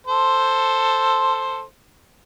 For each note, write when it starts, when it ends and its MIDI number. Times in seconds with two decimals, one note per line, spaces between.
0.07 1.62 69
0.07 1.62 72